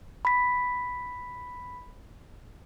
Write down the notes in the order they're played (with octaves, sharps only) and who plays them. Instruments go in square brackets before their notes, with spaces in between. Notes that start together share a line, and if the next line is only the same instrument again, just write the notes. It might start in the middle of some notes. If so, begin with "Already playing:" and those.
[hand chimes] B5 B6